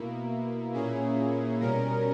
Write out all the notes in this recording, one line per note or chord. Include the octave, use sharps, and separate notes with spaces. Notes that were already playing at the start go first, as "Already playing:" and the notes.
Already playing: B2 A#3 E4
A#2 A#3 C#4 E4 G#4
B2 G3 C#4 A#4